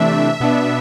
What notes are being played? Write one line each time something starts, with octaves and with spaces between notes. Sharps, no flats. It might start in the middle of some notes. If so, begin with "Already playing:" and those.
Already playing: C3 E3 A3 D4 E5
B2 B3 D4